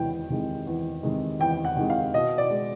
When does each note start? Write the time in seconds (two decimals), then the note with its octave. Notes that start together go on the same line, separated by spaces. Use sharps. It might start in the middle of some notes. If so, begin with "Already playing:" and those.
Already playing: E2 C3 D#3 G#3 G5
0.30 C3 D#3 G#3
0.67 E2
1.03 C3 D#3 G#3
1.40 E2 G5
1.65 F#5
1.77 C3 D#3 G#3
1.90 F5
2.14 B2 D#5
2.38 D5
2.50 G#3